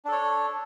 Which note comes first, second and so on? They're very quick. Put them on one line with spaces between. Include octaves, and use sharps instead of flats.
D4 A4 C#5